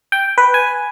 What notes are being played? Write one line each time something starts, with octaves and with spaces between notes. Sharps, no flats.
G5
B4
G#5